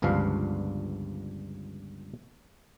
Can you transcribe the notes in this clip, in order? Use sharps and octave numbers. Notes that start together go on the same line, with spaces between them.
G1 C#2 G2 F3 D4 F5